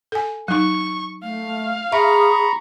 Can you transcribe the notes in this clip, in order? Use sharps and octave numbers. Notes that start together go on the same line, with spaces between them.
A4 G#5
F#3 D#4 C#6
A3 F5
G#4 E5 A#5 B5 C#6